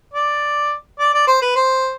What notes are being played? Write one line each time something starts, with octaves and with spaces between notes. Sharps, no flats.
D5
D5
D5
C5
B4
C5